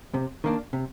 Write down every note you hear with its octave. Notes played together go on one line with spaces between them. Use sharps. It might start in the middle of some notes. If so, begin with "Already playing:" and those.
C3
D#3 A#3 D4
C3